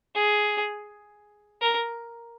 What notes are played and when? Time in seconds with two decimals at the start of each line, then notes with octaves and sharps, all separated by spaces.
0.15 G#4
1.61 A#4